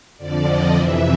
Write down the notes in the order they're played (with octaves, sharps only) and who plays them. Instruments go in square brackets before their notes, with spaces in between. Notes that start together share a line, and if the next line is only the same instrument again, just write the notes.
[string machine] F2 D3 F3 D5
D#5
F2 C3 E3 E5